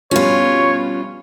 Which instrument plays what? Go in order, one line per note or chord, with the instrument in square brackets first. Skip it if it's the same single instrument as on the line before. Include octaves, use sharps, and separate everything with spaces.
[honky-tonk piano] G2 B2 F3 [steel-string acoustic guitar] C#4 F4 [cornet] C#5